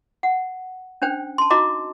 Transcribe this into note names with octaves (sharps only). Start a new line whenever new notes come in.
F#5
C#4 D4 C5 G5
A5 C6
D#4 F#4 D#5 A#5 D6